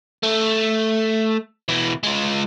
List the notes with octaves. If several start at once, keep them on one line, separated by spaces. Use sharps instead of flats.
A3
B2 E3
G#3 F4